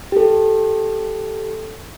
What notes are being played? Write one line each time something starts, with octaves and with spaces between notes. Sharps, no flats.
G4 A4